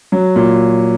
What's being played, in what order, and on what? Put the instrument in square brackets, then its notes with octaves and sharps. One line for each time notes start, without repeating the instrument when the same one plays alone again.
[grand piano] F#3
A#2